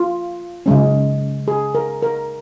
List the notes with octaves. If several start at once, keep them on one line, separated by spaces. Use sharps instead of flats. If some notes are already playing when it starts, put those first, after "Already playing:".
Already playing: F4
C#3 G#3 C#4
G#4
A#4
A#4